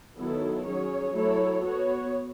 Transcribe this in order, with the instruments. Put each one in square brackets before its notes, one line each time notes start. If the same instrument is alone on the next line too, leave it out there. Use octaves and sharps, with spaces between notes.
[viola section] D#3 F#3 B3 E4 A4
F#3 C#4 G#4 C#5
F#3 A3 E4 A4 C#5
B3 F#4 C#5